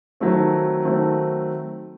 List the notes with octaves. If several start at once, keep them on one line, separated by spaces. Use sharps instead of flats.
D#3 F#3 A3 C4
D#3 F#3 A3 C4